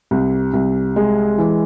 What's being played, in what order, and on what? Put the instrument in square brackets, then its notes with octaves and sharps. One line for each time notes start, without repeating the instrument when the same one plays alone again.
[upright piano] C2
C2
G#3
E3